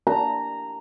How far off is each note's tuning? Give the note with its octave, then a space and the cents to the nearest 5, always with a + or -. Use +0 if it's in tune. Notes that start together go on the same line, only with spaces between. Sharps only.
A#5 -10